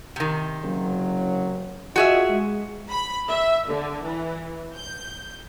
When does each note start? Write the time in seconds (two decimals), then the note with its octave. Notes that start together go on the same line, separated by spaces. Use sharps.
0.16 C3 D#3
0.64 F#1 C#3 F#3
1.96 F4 F#4 G#4 D#5 E5
2.30 G#3
2.90 B5
3.30 E5
3.68 D3
4.04 E3
4.74 G6